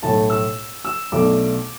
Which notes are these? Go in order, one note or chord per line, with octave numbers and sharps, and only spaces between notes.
B1 A2 A3 A5
E6
E6
B1 B2 A3 D4 D6